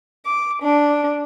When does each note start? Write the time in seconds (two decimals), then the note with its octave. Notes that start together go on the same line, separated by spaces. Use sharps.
0.25 D6
0.61 D4